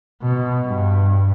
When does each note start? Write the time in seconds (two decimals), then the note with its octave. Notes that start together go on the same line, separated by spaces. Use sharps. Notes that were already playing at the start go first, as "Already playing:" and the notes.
0.22 B2
0.68 G2